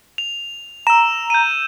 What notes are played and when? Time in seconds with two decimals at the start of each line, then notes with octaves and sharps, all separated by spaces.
0.18 F7
0.87 A#5 E6 E7
1.30 G6 D#7